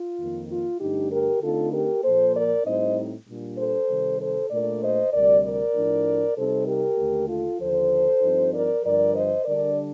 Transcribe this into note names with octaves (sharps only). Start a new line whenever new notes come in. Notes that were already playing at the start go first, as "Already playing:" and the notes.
Already playing: F4
F2 D#3 A#3
F4
G2 D3 A3 D4 D#4 G4
G4 A#4
D3 A3 C4 D#4 F4 A4
G4 A#4
A#2 F3 A#3 A4 C5
A#4 D5
A2 G3 C4 D#4 C5 D#5
A#2 G3 D4
A4 C5
C3 D#3 G3
A4 C5
A#2 A3 D4 A#4 D5
C5 D#5
D2 C3 G3 A#4 D5
A#4 D5
A2 F3 A3 D4
C3 G3 C4 D#4 A4 C5
G4 A#4
D#2 D3 A3
F4 A4
D#2 D3 F3 A4 C5
G2 F3 C4 D#4
A#4 D5
G2 D3 F3 A#4 D5
C5 D#5
D3 G3 D4 A#4 D5